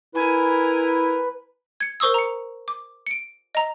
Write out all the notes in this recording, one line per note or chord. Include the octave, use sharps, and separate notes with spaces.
E4 A#4 B4 G#5
G#6 C#7
A#4 C5 C#6 D#6 E6
A#5 C#7
D6
C#7 D7
D#5 A#5